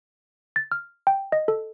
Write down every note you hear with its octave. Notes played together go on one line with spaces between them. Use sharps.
A6
F6
G5
D#5
A4